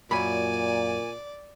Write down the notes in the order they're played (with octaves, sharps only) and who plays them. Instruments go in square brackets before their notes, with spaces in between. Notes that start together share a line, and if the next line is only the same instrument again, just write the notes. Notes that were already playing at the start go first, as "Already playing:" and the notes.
[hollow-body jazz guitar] F#2 B5 [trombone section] A#2 [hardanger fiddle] D5 [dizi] G#5